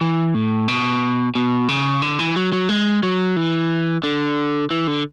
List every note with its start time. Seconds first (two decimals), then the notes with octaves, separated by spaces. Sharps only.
0.01 E3
0.35 A2
0.68 B2
1.35 B2
1.68 C#3
2.02 D3
2.19 E3
2.36 F#3
2.53 F#3
2.69 G#3
3.03 F#3
3.36 E3
4.04 D3
4.71 E3
4.87 D3